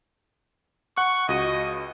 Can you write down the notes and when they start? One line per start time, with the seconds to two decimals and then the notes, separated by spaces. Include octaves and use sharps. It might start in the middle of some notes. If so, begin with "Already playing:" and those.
0.97 F#5 C#6 F#6
1.29 C#2 F#4 D#5 D#7